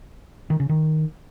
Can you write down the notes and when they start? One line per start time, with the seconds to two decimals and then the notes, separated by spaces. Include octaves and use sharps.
0.50 D#3
0.60 C#3
0.69 D#3